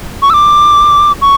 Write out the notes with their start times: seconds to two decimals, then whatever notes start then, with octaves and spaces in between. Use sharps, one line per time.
0.22 C#6
0.30 E6
0.34 D6
1.21 C#6